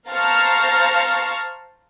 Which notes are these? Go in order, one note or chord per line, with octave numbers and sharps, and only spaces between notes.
C5 F5 A5 A#5 C#6 F6